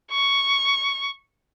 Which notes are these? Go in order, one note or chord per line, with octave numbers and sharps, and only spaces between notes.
C#6